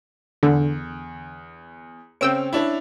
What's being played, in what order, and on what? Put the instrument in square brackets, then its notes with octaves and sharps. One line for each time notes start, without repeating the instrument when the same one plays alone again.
[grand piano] E2 [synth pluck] D3
[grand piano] C#3 C4 C#4 [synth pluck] G5 E6 D7
[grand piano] C#4 D4 E4